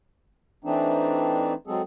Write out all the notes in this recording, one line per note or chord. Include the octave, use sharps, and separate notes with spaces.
E3 A3 C4 D4 D#4
F#3 G#3 C4 G#4 A4